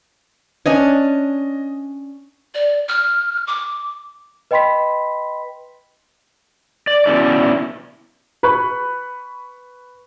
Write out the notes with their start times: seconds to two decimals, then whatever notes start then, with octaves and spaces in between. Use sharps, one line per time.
0.66 C#4 D4 D#5 G#5
2.54 D5
2.88 F6
3.47 D6
4.51 B4 D#5 G5 B5 C6 B6
6.87 D5
7.06 B2 E3 C#4 E4 D5
8.43 B4 B5 C#6 F#6